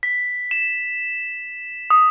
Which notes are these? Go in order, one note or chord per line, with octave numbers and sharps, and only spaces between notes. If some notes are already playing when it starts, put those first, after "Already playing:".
B6
E7
D#6